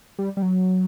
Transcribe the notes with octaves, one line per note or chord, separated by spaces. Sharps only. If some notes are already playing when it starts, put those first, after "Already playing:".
G3
G3
F#3